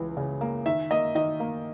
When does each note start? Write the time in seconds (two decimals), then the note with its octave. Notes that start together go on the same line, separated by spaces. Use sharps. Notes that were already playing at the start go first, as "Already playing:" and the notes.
Already playing: C#2 E3
0.17 C#3
0.41 A#3
0.66 D#3 E5
0.91 A#3 D#5
1.15 D#3 D#5
1.40 A#3